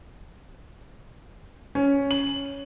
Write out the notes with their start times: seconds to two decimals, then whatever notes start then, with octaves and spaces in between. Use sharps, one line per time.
1.75 C#4
2.11 F#7